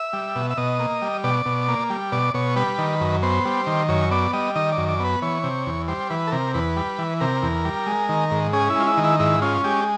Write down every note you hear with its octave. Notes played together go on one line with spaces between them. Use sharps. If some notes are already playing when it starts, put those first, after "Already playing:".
Already playing: E5
G3
B2
E5
B2 D#5
A#3
G3
B2 D5
B2
A#3
G3
B2 D5
B2 C#5
G3 B4
D#3
F#2
B3 C5
G3
D#3
F#2 C#5
B3 D5
G3 D#5
D#3 D#5
D5
F#2
D5
B3 B4
E3 C#5
C3
E2
G3 C5
E3 B4
A4
C3 A#4
E2 B4
G3
E3
C3 A#4
E2
G3
G#3
D#3
G#2
C#4 G#4
E4
G#3 F4
E4
D#3
E4
G#2 E4
C#4 F4
G#3 G4